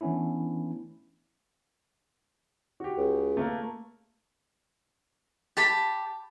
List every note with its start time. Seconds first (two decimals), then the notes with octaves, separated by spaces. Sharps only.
0.01 E3 A3 B3 C#4 D4 E4
2.80 F#4 G4
2.97 C#2
3.37 A3 A#3
5.57 G4 A5 B5